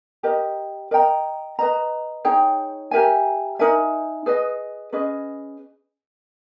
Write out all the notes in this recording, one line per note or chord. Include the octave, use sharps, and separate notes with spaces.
G4 A#4 D#5
A#4 D#5 G5 A#5
B4 D#5 A#5
D#4 G#4 C#5 G5
G4 A#4 E5 G#5
D#4 A#4 E5 G#5
G#4 B4 D#5
C#4 G#4 B4 D#5